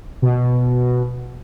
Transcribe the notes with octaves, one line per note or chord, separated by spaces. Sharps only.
B2